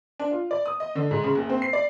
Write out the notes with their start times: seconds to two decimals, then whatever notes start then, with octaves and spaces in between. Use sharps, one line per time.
0.20 D4
0.31 F4
0.51 D5
0.66 D#6
0.80 D#5
0.95 D3
1.11 G#2
1.24 C#3
1.35 F#1
1.49 C4
1.62 C7
1.73 D5